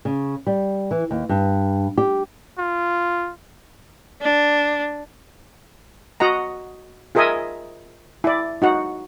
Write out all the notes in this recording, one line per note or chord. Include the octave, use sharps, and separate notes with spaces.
C#3
G3
E3
D#2
G2
G4
F4
D4
F#4 D#5 F#5 A#5
F4 G#4 A#4 D#5 E5 G#5
E4 D5
D#4 F#4 F#5